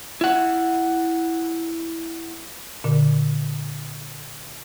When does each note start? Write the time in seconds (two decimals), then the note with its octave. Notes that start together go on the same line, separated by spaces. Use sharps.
0.21 E4 F#5
2.84 A#2 D3